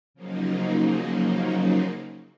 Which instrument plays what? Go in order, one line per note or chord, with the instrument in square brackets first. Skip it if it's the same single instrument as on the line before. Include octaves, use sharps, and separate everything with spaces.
[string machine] C#3 F3 F#3 A#3 D#4